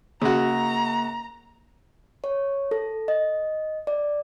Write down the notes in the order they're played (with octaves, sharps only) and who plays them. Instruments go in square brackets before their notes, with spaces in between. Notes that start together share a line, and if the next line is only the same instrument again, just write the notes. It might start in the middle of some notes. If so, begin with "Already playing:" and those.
[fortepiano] C#3 F#4 [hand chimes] A#3 [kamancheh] A#5
[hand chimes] C#5
A4
D#5
D5